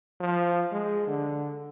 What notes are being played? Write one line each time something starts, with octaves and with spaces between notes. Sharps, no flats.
F3
G#3
D3